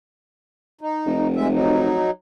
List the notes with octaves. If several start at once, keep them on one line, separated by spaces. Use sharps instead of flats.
D#4
F1
F2 G#3 E5
F#3 D#4